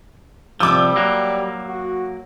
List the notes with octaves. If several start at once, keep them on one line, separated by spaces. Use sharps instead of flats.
C2 F3 G3 D6 E6
F#3 A#3
F#4